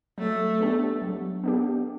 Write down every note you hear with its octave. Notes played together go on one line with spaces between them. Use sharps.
F#3 A3
B3 D4 G4
F#3
B3 D4 G4